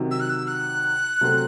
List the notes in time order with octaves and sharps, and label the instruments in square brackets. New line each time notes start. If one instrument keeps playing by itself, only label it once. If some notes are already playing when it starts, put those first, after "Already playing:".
Already playing: [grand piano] C3 D#3 F#3
[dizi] E6
F#6
E6
F#6
[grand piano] C3 F#3 A3 C4